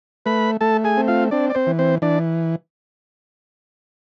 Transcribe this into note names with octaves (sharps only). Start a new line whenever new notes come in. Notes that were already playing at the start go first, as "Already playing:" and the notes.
A3 B4 B5
A3 A4 A5
G#4 G#5
C4
F4 F5
C4 D4 D5
D5
C4 C5
E3
C4 C5
E3 D4 D5